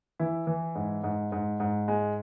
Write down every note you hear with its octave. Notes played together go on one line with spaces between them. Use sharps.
E3 E4
E3
G#2
G#2
G#2
G#2
G#3